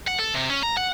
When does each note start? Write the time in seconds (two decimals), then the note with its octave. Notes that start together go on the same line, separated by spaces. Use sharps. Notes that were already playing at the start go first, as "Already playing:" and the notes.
0.07 F#5
0.19 A4
0.34 C3
0.50 C#4
0.63 A#5
0.77 F#5